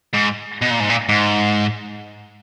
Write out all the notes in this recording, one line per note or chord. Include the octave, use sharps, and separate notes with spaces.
G#2
B2
A#2
G#2
A#2
G#2